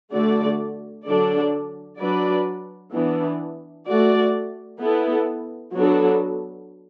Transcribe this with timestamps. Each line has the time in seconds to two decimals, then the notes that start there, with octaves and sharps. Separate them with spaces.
0.12 D3 A3 F#4 D5
1.06 D3 F#3 D4 A4 D5
1.99 F#3 D4 F#4 B4 D5
2.94 E3 B3 D4
3.87 A3 F#4 D5
4.80 B3 E4 A4
5.74 F#3 B3 D4 F#4 A4